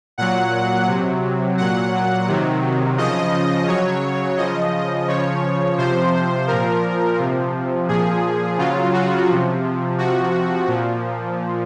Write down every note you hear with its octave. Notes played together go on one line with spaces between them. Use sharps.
A#2 F#3 F#5
C3 F#3
A#2 F#3 F#5
C3 D#3 F#3
C#3 F3 D#5
C#3 F#3 C#5
C#3 F3 D#5
C#3 F3 C#5
C3 F3 C5
A#2 F3 A#4
C3 F3
A#2 F3 G#4
C#3 F#3 F4
F#4
C3 F3
C3 F3 F#4
A#2 F3